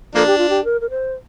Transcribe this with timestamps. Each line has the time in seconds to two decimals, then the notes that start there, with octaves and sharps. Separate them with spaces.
0.15 F3 A#3 D4 A4
0.26 G4
0.38 F4
0.49 G4
0.64 A#4
0.81 A#4
0.90 C5